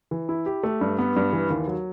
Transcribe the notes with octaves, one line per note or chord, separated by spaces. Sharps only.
E3
E4
G4
A3
G2
B3
G2
E3
D#2
F#3